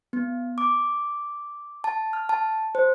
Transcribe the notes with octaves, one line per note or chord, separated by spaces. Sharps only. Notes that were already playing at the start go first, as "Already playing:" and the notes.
B3
D6
A5
F6
A5
C5